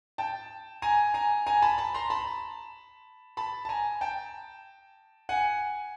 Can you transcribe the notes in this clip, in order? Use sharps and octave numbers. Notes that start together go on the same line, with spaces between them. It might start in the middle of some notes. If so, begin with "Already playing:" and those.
G5 A5
G#5 A#5
G#5 A#5
G#5 A#5
A5 B5
A5 B5
A#5 C6
A5 B5
A5 B5
A5
G#5 A#5
G5 A5
F#5 G#5